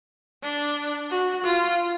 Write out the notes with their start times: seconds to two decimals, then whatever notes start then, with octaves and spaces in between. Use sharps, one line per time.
0.43 D4
1.10 F#4
1.44 F4